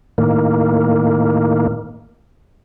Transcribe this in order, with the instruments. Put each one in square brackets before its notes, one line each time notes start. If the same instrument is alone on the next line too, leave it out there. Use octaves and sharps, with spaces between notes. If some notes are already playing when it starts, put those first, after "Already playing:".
[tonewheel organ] A2 D#3 A#3